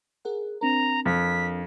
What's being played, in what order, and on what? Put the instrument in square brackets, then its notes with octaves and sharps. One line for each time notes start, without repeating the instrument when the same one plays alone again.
[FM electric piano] G#4 A#4 F#5
[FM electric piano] C4 D4 A#4 [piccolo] A#5
[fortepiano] F2 [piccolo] B6